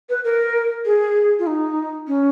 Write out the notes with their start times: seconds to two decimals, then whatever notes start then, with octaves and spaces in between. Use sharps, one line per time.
0.09 B4
0.24 A#4
0.85 G#4
1.39 F4
1.47 D#4
2.08 C#4